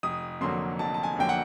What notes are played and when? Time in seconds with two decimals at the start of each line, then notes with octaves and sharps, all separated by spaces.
0.03 F1 D#6
0.41 F2 D3 F#3 A#3 C6
0.79 F1 A5
0.94 A5
1.03 G#5
1.16 F2 D3 F#3 A#3 G5
1.29 F#5